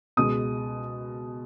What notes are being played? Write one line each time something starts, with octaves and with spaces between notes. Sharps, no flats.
C#2 B2 G#3 D#6